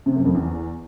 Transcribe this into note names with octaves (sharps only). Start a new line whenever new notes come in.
C3
F#2
F2
E2